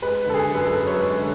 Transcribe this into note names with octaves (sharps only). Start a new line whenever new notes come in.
G#3 B4
D3 A4
G#4
F#2
B4
A4
F#2
C#5
G#3 B4
D3